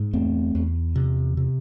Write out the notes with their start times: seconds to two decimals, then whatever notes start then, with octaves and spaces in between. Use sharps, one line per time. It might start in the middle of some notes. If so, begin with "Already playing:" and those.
Already playing: G#2
0.13 E2 A3 C4
0.55 E2
0.96 C3
1.37 C3